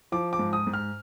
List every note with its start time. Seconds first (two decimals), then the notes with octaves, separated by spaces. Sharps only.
0.12 F3 D6
0.33 D6
0.39 G#2
0.53 D#6
0.67 G#2
0.74 F6